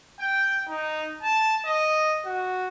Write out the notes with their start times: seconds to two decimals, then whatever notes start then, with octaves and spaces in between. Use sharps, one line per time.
0.20 G5
0.68 D#4
1.22 A5
1.66 D#5
2.25 F#4